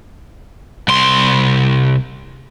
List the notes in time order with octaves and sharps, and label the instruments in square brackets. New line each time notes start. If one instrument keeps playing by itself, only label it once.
[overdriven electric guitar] C2 C6